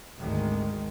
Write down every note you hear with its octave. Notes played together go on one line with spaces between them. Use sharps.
G#1 D2 D#3 G#3